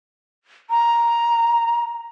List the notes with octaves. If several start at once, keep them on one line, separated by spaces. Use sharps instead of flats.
A#5